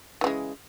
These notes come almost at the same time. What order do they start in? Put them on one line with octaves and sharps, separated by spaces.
E3 C#3 G#3